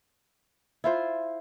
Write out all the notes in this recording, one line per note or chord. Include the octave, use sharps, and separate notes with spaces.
E4 F4 C5